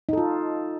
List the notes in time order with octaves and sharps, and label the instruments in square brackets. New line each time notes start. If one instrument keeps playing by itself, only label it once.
[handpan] D#4
A4
F4